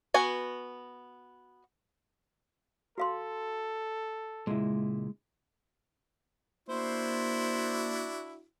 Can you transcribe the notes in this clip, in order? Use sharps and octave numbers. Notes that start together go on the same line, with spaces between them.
B3 F#4 G#5
F#4 A4 F5 C6
C#2 A#2 G#3 E4
A#3 D4 E4 F#4 C5